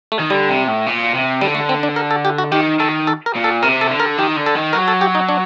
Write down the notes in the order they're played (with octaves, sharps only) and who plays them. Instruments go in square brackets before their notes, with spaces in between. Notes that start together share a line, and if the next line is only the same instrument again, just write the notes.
[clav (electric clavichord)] A3
[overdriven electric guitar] D#3
[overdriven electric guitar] D3 [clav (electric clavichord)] G3
[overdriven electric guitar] C3
A2
A#2
C3
[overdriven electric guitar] D3 [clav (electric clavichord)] G3
[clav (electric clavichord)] A3
C4
D4
A#4
A4
G4
F#4
[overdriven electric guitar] D#3 [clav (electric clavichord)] G4
[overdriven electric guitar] D#3 [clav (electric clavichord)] A4
[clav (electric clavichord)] A4
A#4
[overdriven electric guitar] A#2
[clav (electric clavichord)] A4
[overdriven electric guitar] C3 [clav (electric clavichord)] A#4
[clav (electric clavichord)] A4
[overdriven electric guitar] D3
[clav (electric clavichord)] A#4
[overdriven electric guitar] D#3 [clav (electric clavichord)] G4
[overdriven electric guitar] D3
[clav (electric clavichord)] A4
[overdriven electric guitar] D#3
[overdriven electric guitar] F#3 [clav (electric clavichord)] A#4
[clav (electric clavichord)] A4
G4
D#4
D4